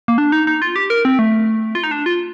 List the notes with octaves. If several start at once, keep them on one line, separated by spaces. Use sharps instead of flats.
A#3
D4
D#4
D#4
F4
G4
A#4
C4
A3
F4
D#4
D4
F4